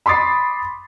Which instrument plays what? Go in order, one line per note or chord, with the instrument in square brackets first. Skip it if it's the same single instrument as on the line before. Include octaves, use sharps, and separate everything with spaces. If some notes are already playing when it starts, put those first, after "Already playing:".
[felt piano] B5 C6 D6 D#6 A6 C7